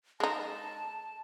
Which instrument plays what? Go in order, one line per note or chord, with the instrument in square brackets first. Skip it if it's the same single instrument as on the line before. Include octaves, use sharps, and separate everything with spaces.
[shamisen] G#3 D#4 [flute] A5